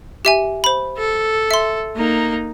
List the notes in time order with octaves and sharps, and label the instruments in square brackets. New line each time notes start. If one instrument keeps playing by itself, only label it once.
[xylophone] G4 E5 G#5
C5 B5
[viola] A4
[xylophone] E5 C6
[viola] A#3 D#4